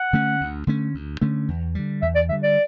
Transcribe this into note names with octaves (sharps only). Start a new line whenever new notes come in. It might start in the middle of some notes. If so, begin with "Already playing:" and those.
Already playing: F#5
D3 A3 C#4
D2
D3 A3 C#4
D2
D3 A3 C#4
E2
D3 G3
E2 E5
D5
D3 G3 E5
D5